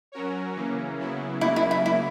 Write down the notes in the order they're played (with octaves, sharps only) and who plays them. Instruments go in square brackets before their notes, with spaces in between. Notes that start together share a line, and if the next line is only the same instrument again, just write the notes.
[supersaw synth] F#3 C#4 F#4 A#4 C#5
C#3 E3 A#3 C#4
C#3 F#3 B3 E4
[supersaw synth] C#3 F#3 A#3 [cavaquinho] E4
[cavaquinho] E4
E4
E4